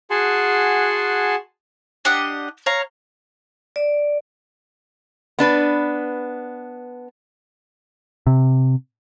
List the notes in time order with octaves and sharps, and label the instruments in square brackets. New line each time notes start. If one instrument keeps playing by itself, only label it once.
[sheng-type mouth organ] F#4 G#4 F#5 G#5 A5 C6
[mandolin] D4 G4 D#5 F#5
C#5 F5 A#5
[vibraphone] D5
[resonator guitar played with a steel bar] B3 D4 B4
[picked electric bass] C3